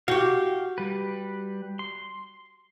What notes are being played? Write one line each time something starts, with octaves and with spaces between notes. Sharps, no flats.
F#4 G4 F5 G5
G3 B4
C6